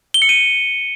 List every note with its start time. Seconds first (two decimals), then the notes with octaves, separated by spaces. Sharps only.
0.14 G7
0.22 C#7
0.29 D#7